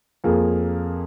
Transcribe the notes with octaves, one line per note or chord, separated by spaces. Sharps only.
F2 A#3 G#4